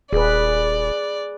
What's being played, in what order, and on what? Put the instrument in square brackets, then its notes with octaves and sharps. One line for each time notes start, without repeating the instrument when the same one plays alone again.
[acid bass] D#1 [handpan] G#4 B4 [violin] D5